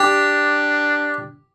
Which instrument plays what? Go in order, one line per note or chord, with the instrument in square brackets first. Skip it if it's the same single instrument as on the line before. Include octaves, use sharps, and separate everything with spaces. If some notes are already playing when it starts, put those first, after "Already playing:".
Already playing: [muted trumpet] D4 [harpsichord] G4